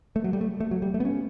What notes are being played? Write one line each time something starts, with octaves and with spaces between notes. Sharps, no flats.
A3
F#3
G3
A3
A3
F#3
G3
A3
B3
C#4